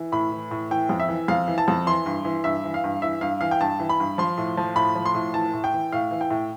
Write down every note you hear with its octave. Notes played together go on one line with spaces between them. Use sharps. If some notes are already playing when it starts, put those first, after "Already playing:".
Already playing: E3
A2 B5
E3
A2
E3 G5
F2
E5
E3
F2 F5
E3
A5
F2
E3 C6
G2
E3
G2 E5
E3
F5
G2
E3 E5
G2 F5
E3 F5
G5
G2 A5
E3
B5
G2
F3 C6
A2
F3
A2 B5
F3
C6
A2
E3 A5
A2
G5
E3
A2 F5
E3
G5
A2